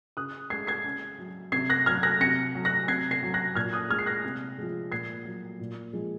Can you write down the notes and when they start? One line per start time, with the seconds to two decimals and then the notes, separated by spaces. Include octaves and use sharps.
0.17 C#3 D#6 F#6
0.50 G#3 G#6 C7
0.67 G#6 C7
0.84 C#3
1.18 F#3
1.52 C3 G#6 C7
1.70 F#6 A#6
1.86 F#3 F6 G#6
2.03 F#6 A#6
2.20 C3 A#6 C#7
2.55 F#3
2.65 F#6 A#6
2.88 C3 G#6 C7
3.11 G#6 C7
3.23 F#3
3.34 F#6 A#6
3.55 A#2 F6 G#6
3.73 D#6 F#6
3.90 G#3 F6 G#6
3.99 C7
4.06 F#6 A#6
4.24 C3
4.58 F3 G#3
4.92 A#2 G#6 C7
5.25 F#3
5.60 A#2
5.93 F3 G#3